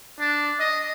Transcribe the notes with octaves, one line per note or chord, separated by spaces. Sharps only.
D4
D#5